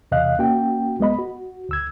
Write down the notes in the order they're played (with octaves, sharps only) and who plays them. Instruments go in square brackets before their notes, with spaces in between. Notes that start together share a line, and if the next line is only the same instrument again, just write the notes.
[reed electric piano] E2 C3 D#5 F5 F#6
A#3 C#4 F#4 G5
C2 G#3 B3 D#5 B5
F#4
D2 E6 G#6